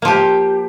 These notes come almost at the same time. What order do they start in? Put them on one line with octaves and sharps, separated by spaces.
A#3 F3 G4